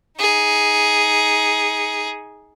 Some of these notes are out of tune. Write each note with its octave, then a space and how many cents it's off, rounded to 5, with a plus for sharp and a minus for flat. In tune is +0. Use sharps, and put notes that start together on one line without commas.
D#4 +25 G#4 +0